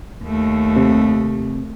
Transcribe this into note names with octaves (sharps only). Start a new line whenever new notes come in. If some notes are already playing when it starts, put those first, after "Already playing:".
D#2 A3
C3